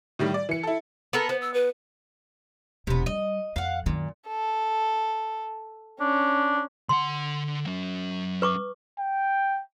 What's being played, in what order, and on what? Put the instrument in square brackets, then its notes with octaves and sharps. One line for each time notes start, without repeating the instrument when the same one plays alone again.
[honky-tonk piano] A2 D#3 G3
D5
E3 C#7
E4 A4
[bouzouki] B3 A4 A#4
[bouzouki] B3 [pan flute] C5
[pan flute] E6
B4
[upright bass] E1 [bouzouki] C3 B3
[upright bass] G3 [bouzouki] D#5
[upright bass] F2 [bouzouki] F5 F#5
[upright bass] F#2 D#3 [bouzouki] A#2
[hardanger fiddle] A4
[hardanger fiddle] C#4 [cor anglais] D4
[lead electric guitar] D3 F#5 [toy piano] C6
[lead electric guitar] F#3 C#4
[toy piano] B4 C#6 D6
[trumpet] G5